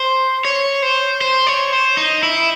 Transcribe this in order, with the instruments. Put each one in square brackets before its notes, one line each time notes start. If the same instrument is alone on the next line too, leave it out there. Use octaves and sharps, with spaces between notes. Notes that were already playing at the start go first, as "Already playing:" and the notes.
Already playing: [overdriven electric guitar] C5
C#5
C5
C5
C#5
C5
D#4
E4